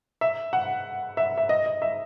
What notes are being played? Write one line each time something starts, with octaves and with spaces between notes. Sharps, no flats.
E5
F#5
E5
E5
D#5
D#5
E5